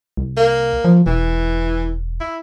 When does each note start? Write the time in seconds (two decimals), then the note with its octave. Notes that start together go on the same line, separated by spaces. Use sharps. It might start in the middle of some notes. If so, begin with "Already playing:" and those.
0.17 C2
0.37 A#3
0.84 F3
1.06 E1 E3
2.20 E4